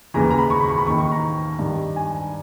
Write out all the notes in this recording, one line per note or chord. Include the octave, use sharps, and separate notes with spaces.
D#2 C#3 E3 A#5
A#5
B5
C#6
B5
C#6
B5
D#2 D#3 C#6
C#6
A#5
G2 D#3
G#5